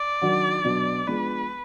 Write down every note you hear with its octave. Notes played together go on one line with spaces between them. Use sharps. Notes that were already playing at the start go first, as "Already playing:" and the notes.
Already playing: D5
D#3 F#3 D4 F#4
B2 F#3 D4
F3 G#3 B3 D4 B4